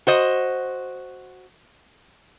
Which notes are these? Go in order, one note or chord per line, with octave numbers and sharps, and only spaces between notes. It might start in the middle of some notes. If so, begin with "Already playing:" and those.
F#4 C5 D#5